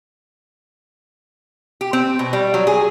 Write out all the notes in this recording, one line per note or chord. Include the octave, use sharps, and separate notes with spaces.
G4
C4
B2
G3
F#3
G#4